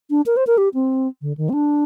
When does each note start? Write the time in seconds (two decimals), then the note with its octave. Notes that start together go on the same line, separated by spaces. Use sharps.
0.10 D4
0.26 A#4
0.37 C5
0.47 A#4
0.58 G4
0.74 C4
1.22 D3
1.38 D#3
1.49 C4
1.54 D4